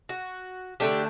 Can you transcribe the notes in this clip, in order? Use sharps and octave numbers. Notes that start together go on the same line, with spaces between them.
F#4
D3 A3 D4 G4